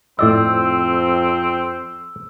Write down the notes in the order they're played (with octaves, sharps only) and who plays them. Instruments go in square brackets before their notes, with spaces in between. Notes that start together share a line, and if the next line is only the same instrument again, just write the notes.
[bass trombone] F2 [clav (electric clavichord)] A2 D5 D#5 [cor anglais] C4 [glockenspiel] E6